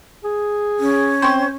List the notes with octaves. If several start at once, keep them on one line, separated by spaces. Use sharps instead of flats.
G#4
C#4
C4 C5 C#6